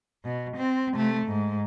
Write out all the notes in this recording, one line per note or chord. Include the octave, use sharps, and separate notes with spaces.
B2
C4
C3 A3
G#2